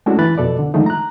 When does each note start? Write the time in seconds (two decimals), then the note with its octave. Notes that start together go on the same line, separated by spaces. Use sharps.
0.06 G#3 A3 C#4 D4 E4 F#4
0.19 E3 B5 F#6 A6
0.38 F2 B2 A4 D5
0.59 D3
0.74 D3 D#3 F3 G#3 A3 D#4
0.86 A#5 F#6